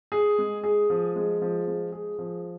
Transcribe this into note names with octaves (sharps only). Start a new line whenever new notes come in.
G#4
G#3
G#4
F3
G#3
F3
G#3
G#4
F3